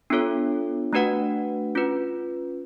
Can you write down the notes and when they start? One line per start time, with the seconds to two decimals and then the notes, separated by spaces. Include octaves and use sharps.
0.10 B3 D4 F4 A4 C#5
0.93 A3 D4 F#4 B4 F#5
1.75 C#4 F4 B4